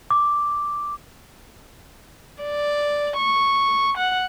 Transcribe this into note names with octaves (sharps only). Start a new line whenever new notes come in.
D6
D5
C#6
F#5